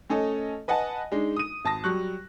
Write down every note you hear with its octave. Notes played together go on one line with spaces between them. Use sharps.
A3 C#4 A4 D#5
B4 D#5 F#5 G#5 A5
G#3 D4 D#4
D#6 D#7
G#1 A5 D#6 A#6
F#3 G3 C#6 F#6